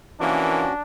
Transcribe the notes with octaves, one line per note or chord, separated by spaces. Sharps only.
C3 E3 F3 A#3 C#4 D4 F#4